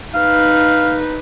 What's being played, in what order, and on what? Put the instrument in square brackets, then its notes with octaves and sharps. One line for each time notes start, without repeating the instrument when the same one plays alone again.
[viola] D#4 B4 [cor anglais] F5